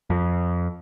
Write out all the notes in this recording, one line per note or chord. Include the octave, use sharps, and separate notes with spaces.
F2